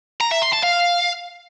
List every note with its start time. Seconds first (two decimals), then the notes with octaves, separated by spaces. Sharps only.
0.21 A#5
0.31 E5
0.42 C6
0.52 A5
0.63 F5